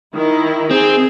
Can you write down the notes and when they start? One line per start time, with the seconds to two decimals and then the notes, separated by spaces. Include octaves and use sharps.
0.14 D#3 E4
0.71 C4 G#4